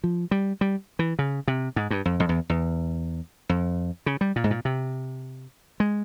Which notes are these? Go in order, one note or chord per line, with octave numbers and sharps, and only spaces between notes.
F3
G3
G3
E3
C#3
C3
G#2
G2
F2
F2
E2
E2
F2
C#3
G3
A#2
G#2
A#2
C3
G#3